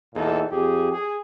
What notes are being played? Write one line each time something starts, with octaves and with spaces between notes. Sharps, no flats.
E2 A#2 D#4 A4
F2 G4 G#4
G#4